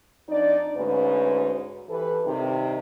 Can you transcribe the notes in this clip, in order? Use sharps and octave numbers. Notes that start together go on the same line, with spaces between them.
F2 D4 D#4 D5
D2 G#2 C#4 F#4 B4
E3 G4 A4 B4
G2 C3 D#3 D#4 G4